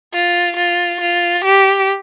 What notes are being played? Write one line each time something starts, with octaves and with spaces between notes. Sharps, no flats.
F4
F4
F4
G4